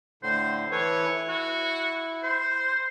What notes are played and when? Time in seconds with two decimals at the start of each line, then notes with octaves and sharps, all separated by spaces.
0.23 A2 D3 C5
0.71 E3 A4 B4 C#5
1.09 E4
1.28 F#4
2.23 C5